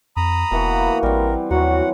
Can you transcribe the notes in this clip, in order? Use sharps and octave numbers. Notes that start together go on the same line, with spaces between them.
F2 A#5 B5 D#6
E1 B2 E3 A#3 F#4
A1 G3 C4 A#4
D#2 E3 F#3 F#4 F#5